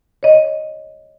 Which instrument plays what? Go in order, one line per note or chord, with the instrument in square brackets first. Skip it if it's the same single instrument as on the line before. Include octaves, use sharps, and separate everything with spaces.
[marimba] C#5 D#5